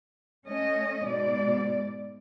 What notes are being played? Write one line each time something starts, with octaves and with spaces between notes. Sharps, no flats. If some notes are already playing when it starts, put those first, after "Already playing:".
A3 C#4 D#5
G#2 B2 D5